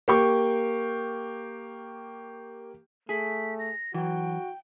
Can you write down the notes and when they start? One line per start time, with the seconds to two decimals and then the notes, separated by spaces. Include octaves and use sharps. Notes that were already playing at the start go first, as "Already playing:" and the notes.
0.08 A#3 G4 C#6
3.09 A3 G#4 B6
3.59 A#6
3.94 E3 F#3 F#4 G5